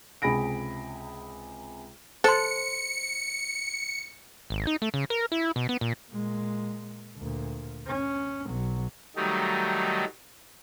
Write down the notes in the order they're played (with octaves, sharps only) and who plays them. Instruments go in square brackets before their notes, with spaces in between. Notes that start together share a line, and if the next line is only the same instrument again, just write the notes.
[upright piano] C#2 C3 G#4 B5 A#6 D7
[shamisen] A4 [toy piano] C5 C6 [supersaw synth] C#7
[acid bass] G#1
D#4
A3
C#3
A#4
E4
B2
B3
A#2
[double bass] A#2 G#3
D2 A#2
C#4
B1 F#3
[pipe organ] D#3 F#3 G3 A3 D#4